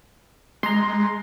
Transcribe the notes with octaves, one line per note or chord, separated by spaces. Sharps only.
G#3 A#5 C6